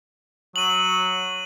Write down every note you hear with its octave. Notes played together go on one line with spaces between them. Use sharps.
F#3 D#7 F#7